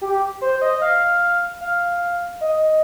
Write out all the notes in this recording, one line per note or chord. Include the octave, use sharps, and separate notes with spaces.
G4
C5
D#5
F5
F5
D#5